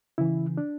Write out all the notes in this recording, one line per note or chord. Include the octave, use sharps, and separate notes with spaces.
C#3 E3 E4
D4